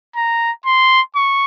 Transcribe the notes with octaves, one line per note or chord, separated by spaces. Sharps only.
A#5
C6
C#6